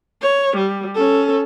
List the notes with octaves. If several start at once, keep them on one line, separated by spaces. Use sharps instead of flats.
C#5
G3
C#4 A4